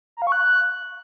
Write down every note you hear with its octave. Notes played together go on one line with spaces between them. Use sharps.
A#5
F5
C#6
F#6